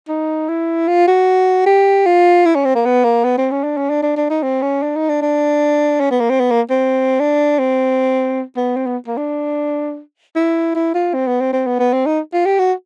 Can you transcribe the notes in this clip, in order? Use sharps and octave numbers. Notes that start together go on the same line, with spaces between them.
D#4
E4
F4
F#4
G4
F4
E4
C#4
C4
A#3
B3
A#3
B3
C4
C#4
D4
C#4
D4
D4
D4
D#4
C4
C#4
D4
D#4
D4
D4
C#4
B3
A#3
C4
B3
A#3
C4
D4
C4
B3
C4
B3
A#3
D4
E4
E4
F4
C4
B3
C4
C4
B3
B3
C4
D#4
F4
G4
F#4